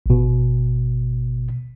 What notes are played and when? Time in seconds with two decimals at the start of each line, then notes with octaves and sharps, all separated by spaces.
0.06 G#1 B2